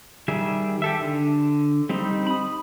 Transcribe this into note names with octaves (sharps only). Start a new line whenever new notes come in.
D#3 G3 G#4 E5
G4 A4 E5
D3
G3 C4 D#4
B5 D#6